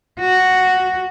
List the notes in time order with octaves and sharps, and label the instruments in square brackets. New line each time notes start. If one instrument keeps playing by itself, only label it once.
[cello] F#4